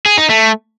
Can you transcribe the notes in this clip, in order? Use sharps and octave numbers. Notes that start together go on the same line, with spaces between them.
G#4
D#4
A3